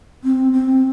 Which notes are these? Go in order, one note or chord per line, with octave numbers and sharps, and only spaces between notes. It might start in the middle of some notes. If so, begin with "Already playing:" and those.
C4
C4